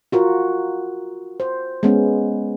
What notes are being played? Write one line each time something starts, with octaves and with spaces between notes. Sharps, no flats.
F4 F#4 A#4
C5
G#3 B3 C#4